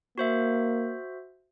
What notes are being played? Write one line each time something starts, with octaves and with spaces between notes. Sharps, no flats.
A#3 F#4 C5 E5